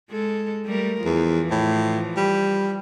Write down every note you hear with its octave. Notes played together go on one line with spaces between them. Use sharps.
G#3 A4
G3 A3 A#4
E2 E3 F3
A2
G3